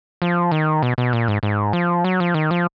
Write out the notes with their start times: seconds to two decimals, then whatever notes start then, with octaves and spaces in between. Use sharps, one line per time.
0.22 F3
0.51 D#3
0.83 B2
0.98 B2
1.13 A#2
1.28 G#2
1.43 G#2
1.73 F3
2.04 F#3
2.20 F3
2.34 D#3
2.51 F3